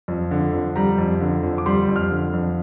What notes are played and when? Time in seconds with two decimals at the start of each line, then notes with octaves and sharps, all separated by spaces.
0.08 F2
0.31 D3
0.53 F2
0.76 G3 A#5
0.98 F2
1.21 D3
1.43 F2
1.58 D6
1.66 G3 C6
1.89 F2
1.96 F6
2.11 D3
2.34 F2